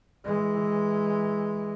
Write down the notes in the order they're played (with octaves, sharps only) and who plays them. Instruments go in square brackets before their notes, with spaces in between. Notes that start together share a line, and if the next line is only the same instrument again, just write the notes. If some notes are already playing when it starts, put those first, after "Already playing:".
[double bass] E3 G#3